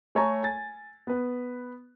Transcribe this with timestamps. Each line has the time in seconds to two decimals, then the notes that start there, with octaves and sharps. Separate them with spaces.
0.15 A3 A4 C#5 G#5 A#5 C#6
0.43 G#5 A6
1.07 B3 B4